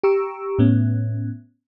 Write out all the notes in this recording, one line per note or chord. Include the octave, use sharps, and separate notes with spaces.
G4 A#5 C#6 E6
A2 B3 C#4